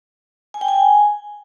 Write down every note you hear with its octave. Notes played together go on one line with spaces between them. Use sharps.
G#5
G5
G#5